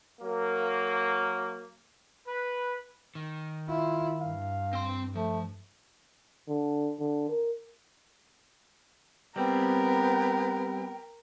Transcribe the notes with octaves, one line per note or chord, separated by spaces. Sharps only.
F#3 A#3
B4
D#3
E4 F4
G2 F5
C4 C6
F3 A3
D3
D3
A#4
G3 B3 C4 A#4 G5